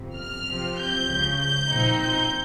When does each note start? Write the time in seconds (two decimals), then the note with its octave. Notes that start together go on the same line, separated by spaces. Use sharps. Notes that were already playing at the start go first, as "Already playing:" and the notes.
Already playing: G1 F2 C3
0.15 F6
0.46 C2 C3 F3 C4
0.77 G6
1.07 C#2 C#3 F3
1.38 G6
1.68 A#2 F3 C4 D#4
1.99 G6